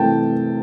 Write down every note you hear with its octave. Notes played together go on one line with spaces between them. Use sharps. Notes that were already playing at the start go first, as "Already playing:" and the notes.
Already playing: C3 E3 A3 G5 A5